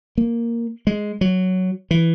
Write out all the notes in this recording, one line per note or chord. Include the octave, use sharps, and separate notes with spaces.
A#3
G#3
F#3
E3